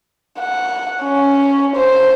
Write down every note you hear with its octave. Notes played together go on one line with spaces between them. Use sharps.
F#5
C#4
C5